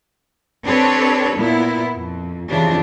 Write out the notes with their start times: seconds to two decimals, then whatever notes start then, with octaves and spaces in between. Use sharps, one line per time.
0.65 C4 D4 G4 A4 B4 C#5
1.37 A#2 B3 E4
1.96 F2
2.49 F2 C#3 E3 D4 G4